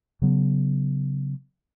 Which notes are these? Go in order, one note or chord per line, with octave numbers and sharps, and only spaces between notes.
C#3 F#3 B3